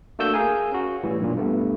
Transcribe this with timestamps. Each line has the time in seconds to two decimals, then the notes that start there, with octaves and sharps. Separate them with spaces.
0.19 A3 A#3 D4 F#4 E6 G6
0.34 G#4 A#4 F5 G#5
0.72 C#4 F#4
1.03 A2 E3 G3
1.19 B1 G2 A#2
1.36 G2 A3 B3